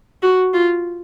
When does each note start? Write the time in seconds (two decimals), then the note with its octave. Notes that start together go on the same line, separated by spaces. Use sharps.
0.22 F#4
0.54 F4